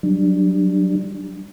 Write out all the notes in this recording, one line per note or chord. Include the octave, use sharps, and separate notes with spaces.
F#3 G3 D4